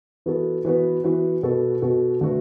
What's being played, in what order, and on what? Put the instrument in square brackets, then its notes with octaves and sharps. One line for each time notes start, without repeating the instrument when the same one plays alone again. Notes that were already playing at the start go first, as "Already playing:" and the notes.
[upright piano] E3 B3 F#4 A4
E3 B3 F#4 B4
E3 B3 F#4 B4
B2 B3 F#4 A4
B2 B3 F#4 A4
D3 A3 F#4 B4